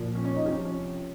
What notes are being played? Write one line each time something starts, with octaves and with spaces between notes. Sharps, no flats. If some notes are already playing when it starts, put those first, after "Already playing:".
Already playing: A#2 F3
C#4
C#4
D#4
C3 F3 C#4
C#4